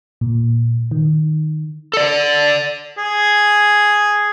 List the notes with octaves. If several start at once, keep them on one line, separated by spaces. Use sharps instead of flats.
A#2
D#3
A4 D5
G#4